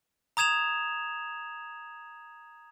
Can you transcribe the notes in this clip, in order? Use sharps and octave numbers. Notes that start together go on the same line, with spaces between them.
A#5 D#6 G#6 E7 F7